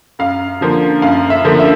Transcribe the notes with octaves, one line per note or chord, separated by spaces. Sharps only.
F#2 F5
D3 F3 A#3
F#2 F5
E5
D3 F3 A#3
E5